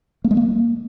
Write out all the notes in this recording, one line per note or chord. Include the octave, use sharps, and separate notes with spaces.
A#3
G#3
A#3